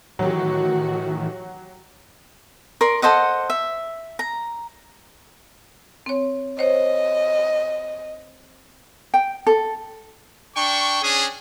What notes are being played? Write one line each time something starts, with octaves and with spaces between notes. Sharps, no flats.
A2 D#3 E3 F#3 F#4 G4
A#4 D5 C6
A4 C5 D#5 F#5
E5
A#5
C4 C#5
C5 C#5 D#5
G5
A4
D4 G5 C#6
C#4 D4 G#4